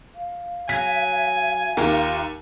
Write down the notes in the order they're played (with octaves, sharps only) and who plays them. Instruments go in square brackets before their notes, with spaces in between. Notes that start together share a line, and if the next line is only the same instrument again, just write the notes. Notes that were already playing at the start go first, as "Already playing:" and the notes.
[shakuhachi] F5
[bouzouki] F#3 [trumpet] G#5 [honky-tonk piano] B6
[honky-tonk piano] D#2 [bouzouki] F4 G4 A#4